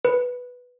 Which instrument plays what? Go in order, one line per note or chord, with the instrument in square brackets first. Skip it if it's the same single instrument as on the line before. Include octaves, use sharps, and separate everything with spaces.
[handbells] B4